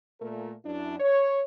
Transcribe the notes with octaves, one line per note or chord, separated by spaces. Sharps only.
A#2 A3 A#4
F#2 D4 E4
C#5